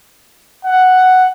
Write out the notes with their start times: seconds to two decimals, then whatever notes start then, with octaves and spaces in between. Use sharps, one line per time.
0.65 F#5